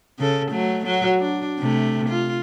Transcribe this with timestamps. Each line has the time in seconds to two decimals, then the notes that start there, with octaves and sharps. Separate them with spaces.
0.19 C#3 A4
0.51 F#3 A3
0.86 F#3 F#4
1.19 D4
1.59 C3 A3
2.09 F4